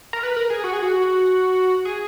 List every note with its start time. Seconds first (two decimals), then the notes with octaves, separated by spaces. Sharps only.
0.13 A#4
0.23 B4
0.36 A#4
0.50 G#4
0.64 F#4
0.73 G#4
0.83 F#4
1.85 G#4